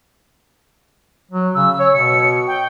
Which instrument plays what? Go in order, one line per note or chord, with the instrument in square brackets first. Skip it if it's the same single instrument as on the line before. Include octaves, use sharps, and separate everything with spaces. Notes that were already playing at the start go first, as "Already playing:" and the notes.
[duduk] F#3
[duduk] C#3 [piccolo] E6
[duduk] C#5
[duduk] B2 [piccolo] C#7
[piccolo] G5